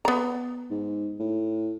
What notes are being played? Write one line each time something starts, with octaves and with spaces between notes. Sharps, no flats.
B3 A#5
G#2
A2